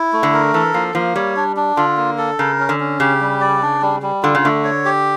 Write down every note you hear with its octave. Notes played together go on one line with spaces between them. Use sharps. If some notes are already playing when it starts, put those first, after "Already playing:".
Already playing: E4
A3
D3
A#4
E3 A4
F3 A#3
F3 A#3
G3 C#5
D4
D4
D3 F4
A#3
A4
C#3 A#4
C#4
D3
C#4
C#3 G4
G3
D5
D4
G3
G3
D3 F4
C#3
D3 A3
C#5
G4